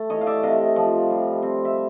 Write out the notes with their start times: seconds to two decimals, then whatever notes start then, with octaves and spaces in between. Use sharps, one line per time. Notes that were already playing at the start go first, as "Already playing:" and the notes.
Already playing: A3
0.10 E3 C#5 D#5
0.21 F5
0.27 D5 E5
0.43 C3 D#5 F5
0.76 F3
1.09 G3
1.43 C4
1.65 E5